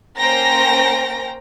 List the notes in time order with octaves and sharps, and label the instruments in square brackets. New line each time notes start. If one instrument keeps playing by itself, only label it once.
[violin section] A#3 C#4 C5 G5 A#5 A#6